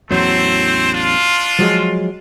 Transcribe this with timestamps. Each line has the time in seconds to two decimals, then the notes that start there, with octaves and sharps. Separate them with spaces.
0.11 A1 E2 F#3 A3 C4 C5
0.93 D4 F4
1.59 F3 F#3 G#3